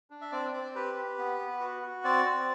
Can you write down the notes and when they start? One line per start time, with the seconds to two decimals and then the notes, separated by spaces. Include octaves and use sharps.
0.10 D4
0.21 E5
0.32 C4 D5
0.53 C4 D5
0.75 G4 B4
0.97 G4
1.18 B3
1.39 B3
1.60 F#4
1.82 F#4
2.04 C4 D5
2.25 C4